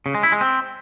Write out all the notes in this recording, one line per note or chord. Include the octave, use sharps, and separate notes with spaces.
C#3
G#3
E4
G#3
C4